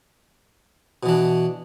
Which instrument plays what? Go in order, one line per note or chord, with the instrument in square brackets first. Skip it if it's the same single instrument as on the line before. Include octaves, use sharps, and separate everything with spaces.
[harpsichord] B2
E3
D4